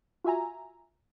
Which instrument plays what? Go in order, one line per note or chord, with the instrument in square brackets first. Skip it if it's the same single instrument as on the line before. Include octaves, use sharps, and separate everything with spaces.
[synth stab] F4 F#4 E5 G#5 A#5